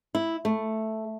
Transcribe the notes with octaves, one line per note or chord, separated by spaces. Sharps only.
E4
A3